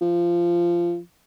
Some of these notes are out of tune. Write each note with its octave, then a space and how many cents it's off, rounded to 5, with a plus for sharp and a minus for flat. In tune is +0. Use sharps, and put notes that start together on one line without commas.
F3 -15